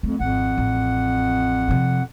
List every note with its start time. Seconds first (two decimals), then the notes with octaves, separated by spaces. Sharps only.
0.03 F2 A3
0.20 G#1 F2 F#5
0.58 A1
1.68 C3 F3